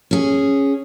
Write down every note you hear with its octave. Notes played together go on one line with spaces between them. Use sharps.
C#4 G#4